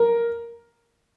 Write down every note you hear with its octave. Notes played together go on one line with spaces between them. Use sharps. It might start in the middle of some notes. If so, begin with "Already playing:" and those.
Already playing: A#4